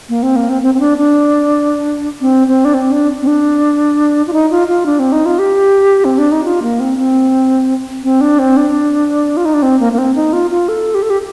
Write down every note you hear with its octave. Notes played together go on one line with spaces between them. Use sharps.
A#3
C4
A#3
C4
C4
C4
D4
D4
C4
C4
D4
C4
D4
C4
D4
F4
D#4
F4
F4
D4
C4
D#4
F4
G4
C4
D4
D#4
F4
A#3
C4
C4
C4
D4
C4
D4
F4
D#4
D4
C4
A#3
A#3
C4
D#4
F4
F4
A4
G4
A4
G4